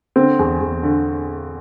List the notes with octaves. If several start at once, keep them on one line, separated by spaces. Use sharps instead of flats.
D3 C4
E2
E2
D3